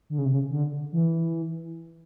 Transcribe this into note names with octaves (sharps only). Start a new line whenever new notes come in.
D3
C#3
C3
C#3
D3
E3